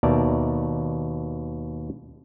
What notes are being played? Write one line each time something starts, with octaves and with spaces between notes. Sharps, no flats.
D#2 B2 A#4 D5 E5 A5